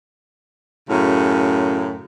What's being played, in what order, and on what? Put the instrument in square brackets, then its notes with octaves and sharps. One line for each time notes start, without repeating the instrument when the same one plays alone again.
[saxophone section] F#2 A2 C#3